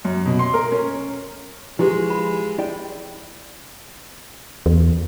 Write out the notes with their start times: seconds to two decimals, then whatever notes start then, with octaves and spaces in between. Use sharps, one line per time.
0.05 F#2
0.26 B2
0.39 C6
0.54 A#4
0.72 C#4
1.79 F3 G#3 E4 G4 B4
2.10 B5
2.58 E4 D5 G5
4.66 E2